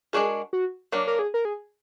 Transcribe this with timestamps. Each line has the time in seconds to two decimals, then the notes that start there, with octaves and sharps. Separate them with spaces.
0.13 G#3 D4 F#4 G#4 A#4
0.53 F#4
0.92 F#3 A#3 D4 A#4
1.07 A#4
1.19 G#4
1.34 A#4
1.45 G#4